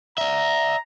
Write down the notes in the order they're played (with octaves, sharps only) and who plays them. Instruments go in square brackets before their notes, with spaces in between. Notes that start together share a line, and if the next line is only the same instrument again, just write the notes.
[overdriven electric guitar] D5 E5 [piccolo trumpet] A#5